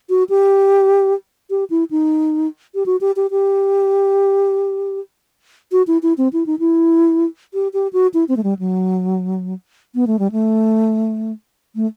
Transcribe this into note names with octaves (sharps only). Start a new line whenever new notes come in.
F#4
G4
G4
E4
D#4
G4
F#4
G4
G4
G4
F#4
E4
E4
C4
E4
D#4
E4
G4
G4
F#4
E4
C4
A3
G3
F#3
B3
A3
G3
A3
A3